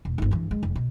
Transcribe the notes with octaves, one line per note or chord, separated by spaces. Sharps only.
E1
G1 D#4
G2 E3
G#3
F1
B2